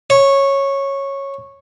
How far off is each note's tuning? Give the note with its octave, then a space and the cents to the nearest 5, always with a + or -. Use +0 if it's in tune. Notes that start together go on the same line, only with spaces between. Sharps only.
C#5 -10